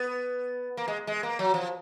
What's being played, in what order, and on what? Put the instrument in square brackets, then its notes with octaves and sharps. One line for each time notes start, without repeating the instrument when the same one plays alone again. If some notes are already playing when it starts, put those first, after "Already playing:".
Already playing: [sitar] B3
A#3
G#3
G#3
A#3
F#3
F3